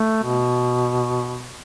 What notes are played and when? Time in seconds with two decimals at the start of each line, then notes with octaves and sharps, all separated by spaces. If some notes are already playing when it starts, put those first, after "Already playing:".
Already playing: A3
0.23 B2